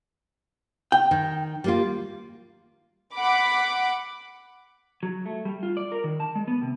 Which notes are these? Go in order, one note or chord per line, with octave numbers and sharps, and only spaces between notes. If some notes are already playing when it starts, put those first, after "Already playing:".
G5
D#3
G3 A#3 F4
F#5 B5 D6
F#3
A3
G3
F4
D5
A#4
D#3
A5
G#3
B3
C3